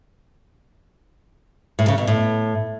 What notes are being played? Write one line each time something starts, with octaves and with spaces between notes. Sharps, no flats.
A2
C#3
B2
A2